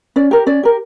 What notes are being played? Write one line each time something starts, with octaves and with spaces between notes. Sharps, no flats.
C#4 D5
G4 A#4
C#4 D5
G4 A#4